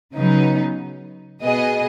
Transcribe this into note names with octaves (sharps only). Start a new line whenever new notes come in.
C#3 F#3 B3 D#4
B2 B3 G#4 D#5